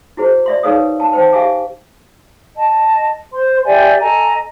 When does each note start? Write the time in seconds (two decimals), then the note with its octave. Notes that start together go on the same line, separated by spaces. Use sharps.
0.17 E4 F#4 G#4 C5
0.46 D5 E5 C6
0.63 D#4 G#4 B4 C#5 F5 D#6
1.00 A5
1.13 C5 G5 A5
1.33 G4 E5 F5 G#5 D6
2.55 D#5 A5
3.31 C5 C6
3.64 G4 D5 E5 G#5
4.00 A4 D#5 G#5 A#5